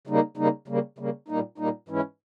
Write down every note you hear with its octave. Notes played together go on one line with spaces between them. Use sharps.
C#3 G3 A#3 D#4
C#3 G3 A#3 D#4
C#3 G3 A#3
C#3 G3 A#3
A#2 G3 A#3 D#4
A#2 G3 A#3 D#4
G#2 E3 G#3 C#4 E4